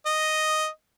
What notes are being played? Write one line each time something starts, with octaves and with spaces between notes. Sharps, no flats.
D#5